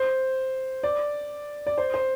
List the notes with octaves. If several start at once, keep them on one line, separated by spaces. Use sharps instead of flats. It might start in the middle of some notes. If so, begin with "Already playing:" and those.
Already playing: C5
D5
D5
C5
C5